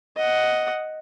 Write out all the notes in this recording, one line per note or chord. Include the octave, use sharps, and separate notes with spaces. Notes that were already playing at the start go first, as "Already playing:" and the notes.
D#5 F#5